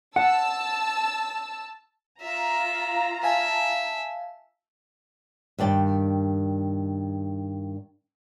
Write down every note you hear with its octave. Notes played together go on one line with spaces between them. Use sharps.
F#5 A5 E6
F4 E5 A#5
E5 F5 G#5 A5
G2 D#3 D5 G5